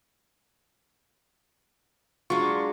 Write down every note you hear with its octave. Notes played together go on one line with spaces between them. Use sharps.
F#3 G#3 D4 F4 C#6